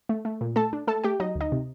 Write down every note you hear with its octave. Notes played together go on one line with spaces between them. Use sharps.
A3
A3
A#2
A3 A4 A5
D4
A3 A4 A5
A3 G4 G5
F#3 D#4 D#5
D2
D#4 D#5
C3